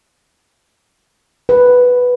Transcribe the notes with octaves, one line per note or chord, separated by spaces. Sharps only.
B4